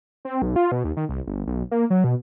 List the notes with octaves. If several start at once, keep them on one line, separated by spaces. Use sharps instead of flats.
C4
B1
F4
B2
D#2
D#3
C2
G1
B1
A#3
F#3
B2